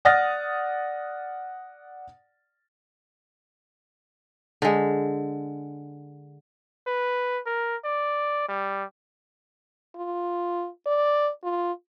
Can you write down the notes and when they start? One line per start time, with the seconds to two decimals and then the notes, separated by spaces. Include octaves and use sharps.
0.05 D5 F#5 D#6 F6 A6 A#6
4.62 D3 G#3
6.87 B4
7.46 A#4
7.85 D5
8.49 G3
9.95 F4
10.87 D5
11.44 F4